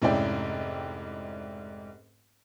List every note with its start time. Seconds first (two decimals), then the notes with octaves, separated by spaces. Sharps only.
0.02 F1 G#2 C#4 E4 D5 G5